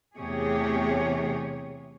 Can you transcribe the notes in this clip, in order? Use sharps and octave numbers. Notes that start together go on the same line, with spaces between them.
E2 C3 A3 G4 G#4 C#5